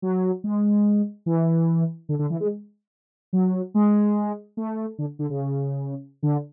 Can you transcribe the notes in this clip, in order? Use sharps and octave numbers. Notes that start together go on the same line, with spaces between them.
F#3
G#3
E3
D3
D3
E3
G#3
F#3
G#3
A3
D3
D3
C#3
D3